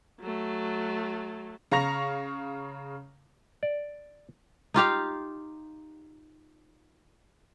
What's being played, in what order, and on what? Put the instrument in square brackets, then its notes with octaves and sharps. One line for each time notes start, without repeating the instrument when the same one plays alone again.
[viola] F#3 A3
[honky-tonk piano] C#3 F5 A#5 C#6 A#6 F7
[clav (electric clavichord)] D5
[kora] D#4 F4 G4 F5